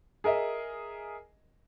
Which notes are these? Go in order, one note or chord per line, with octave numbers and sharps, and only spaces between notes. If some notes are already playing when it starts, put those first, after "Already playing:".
G#4 A#4 D#5 E5